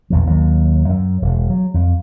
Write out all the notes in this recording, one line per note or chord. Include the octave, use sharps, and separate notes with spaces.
A#1 E2 F3
D#2 F#3
F#2
E1
F#3
F2